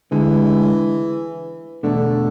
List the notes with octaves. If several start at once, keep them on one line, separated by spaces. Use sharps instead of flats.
D2 D3 E3 G#3
E2 B2 D3 A3 D4